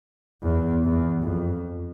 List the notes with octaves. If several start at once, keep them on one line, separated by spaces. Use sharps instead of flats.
E2
E2
F2